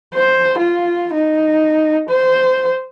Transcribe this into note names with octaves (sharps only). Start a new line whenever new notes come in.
C5
F4
D#4
C5